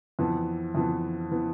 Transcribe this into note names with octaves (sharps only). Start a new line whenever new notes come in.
F2 E3 B3
F2 E3 B3
E3 B3